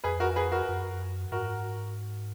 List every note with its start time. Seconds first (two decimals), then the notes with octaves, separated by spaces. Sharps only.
0.04 F2 G#4 B4
0.20 F#4 A#4
0.36 G#4 B4
0.52 F#4 A#4
0.69 F#2
1.32 G#2 F#4 A#4